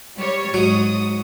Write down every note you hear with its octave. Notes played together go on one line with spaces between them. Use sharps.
G3 C#5
G#2 F#3 D#6